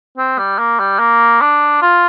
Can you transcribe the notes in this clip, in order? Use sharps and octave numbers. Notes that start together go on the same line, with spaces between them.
C4
G3
A#3
G3
A#3
D4
F4